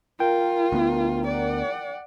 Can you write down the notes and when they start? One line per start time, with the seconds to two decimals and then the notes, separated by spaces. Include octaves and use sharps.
0.20 F4 A#4 G5
0.72 D2 B3
1.27 D5 F#5